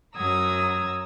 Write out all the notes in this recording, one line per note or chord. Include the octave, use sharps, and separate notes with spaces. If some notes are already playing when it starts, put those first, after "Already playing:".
F#2 F#3 A#5 D#6 E6 G#6